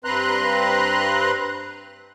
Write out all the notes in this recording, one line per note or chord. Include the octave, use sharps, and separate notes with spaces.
G2 C4 B4 A#5 C6 F#6